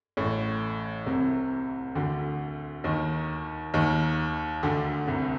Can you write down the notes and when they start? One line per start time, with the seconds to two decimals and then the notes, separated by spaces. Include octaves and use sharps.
0.17 A1 A2
1.06 C2 C3
1.95 D2 D3
2.84 D#2 D#3
3.74 D#2 D#3
4.63 D2 D3
5.07 C2 C3